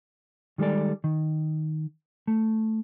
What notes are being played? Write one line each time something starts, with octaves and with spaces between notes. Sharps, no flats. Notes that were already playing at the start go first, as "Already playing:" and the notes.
D#3 G3 G#3 A4 D5
D#3
A3